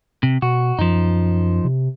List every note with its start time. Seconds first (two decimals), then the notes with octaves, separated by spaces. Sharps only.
0.23 C3
0.42 B2 F#4
0.79 F#2 F3 D#4
1.65 C3